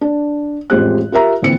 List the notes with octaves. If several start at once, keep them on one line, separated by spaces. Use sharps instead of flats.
D4
A1 F2 G#3 G4 C5 F#6
F4 G4 A#4 E5 A#5
A#1 D3 E3 C4 C#7